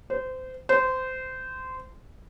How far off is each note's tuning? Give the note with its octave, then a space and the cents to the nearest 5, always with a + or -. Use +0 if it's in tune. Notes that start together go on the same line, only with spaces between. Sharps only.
C5 -25
C5 -20